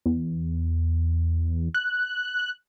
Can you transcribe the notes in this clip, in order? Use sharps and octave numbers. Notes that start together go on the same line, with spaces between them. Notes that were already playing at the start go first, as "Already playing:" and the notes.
E2
F#6